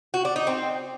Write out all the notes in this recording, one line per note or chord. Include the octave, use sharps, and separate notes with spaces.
F#4
D4
D#4
C4